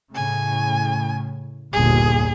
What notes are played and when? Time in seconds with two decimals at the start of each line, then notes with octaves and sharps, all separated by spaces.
0.15 A2 C#3 G#5
1.73 G1 D#2 A#2 G#4